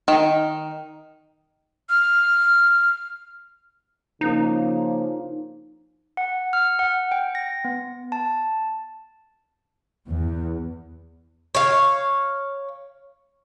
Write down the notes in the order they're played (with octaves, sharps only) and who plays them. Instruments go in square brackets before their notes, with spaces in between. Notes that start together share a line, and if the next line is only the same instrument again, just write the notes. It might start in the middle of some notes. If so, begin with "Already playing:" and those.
[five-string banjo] D#3
[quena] F6
[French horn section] C#3 F3 A#3 [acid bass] D#4
[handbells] F#5
F6
F#5
G5
A#6
B3
A5
[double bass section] E2
[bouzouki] C#5 F5